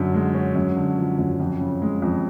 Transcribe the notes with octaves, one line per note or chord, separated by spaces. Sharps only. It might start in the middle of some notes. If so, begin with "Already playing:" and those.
Already playing: F#2 D3
G#3
C#4
F#2
D3
F3
F#2
F2
C#3
G#3
F2